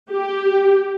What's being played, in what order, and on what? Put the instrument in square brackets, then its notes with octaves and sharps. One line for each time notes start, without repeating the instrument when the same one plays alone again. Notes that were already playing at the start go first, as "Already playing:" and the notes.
[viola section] G4